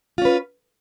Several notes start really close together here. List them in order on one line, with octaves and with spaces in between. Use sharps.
F4 C#4 B4